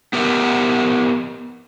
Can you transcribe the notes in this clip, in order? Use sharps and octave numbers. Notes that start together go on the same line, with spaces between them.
B3 G4 A#4 E5 F#5